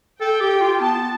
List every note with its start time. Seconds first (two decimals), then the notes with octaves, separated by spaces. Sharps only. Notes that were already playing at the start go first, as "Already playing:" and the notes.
0.21 A4 G5
0.40 G4
0.61 F4
0.80 B3 A5